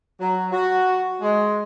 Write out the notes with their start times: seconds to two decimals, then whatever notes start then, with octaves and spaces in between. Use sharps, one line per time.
0.21 F#3
0.52 F#4
1.21 G#3